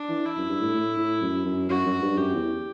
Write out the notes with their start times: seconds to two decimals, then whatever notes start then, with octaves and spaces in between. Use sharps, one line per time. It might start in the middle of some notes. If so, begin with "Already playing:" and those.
Already playing: D4
0.09 E3
0.25 E4
0.37 F#2
0.49 G2
0.61 A2
0.74 A2
0.98 A2
1.22 F#2
1.45 F#2
1.69 F#2 F#4
1.86 F#2
2.01 G2
2.17 F#2 G4
2.34 E2